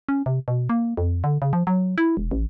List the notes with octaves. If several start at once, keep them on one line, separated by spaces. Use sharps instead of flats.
C#4
C3
B2
A#3
F2
D3
C#3
F3
F#3
E4
E1
A1